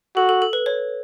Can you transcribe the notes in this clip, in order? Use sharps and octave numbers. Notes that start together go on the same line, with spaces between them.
F#4 A4
A4
A4
B4
C#5